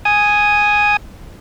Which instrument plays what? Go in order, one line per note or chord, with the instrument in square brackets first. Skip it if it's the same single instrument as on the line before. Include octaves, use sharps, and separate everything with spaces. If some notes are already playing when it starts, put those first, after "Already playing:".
[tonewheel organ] G#5 D#6